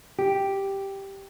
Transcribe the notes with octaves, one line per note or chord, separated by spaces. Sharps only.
G4